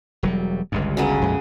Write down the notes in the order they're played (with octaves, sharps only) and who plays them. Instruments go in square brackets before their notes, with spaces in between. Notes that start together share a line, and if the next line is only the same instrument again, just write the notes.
[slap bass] E1 F#3 G3
G1 C#2 G2
[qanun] C#3 F#3 B3
[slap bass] A#1 F2 G#3